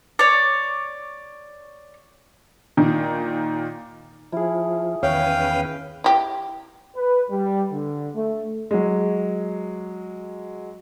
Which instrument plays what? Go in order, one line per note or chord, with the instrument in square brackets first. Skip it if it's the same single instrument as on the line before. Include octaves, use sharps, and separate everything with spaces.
[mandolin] C#5 D5
[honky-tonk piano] A#2 D#3
[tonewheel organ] F3 [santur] E4 G#4
[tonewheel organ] E2 C#4 B4 [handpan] D#3 C#5 [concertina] F5 G5
[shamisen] E4 G4
[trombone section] B4
G3
D3
A3
[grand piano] F#3 G#3